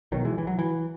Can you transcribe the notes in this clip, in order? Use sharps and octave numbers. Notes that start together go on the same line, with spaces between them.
B1 B2 D#3 F#3
E3 G#3
E3
F#3
E3